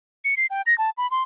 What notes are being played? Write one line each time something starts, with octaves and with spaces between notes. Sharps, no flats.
C#7
C7
G5
A#6
A5
B5
C6